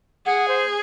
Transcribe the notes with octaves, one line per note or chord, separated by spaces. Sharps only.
G#4 F#5
C5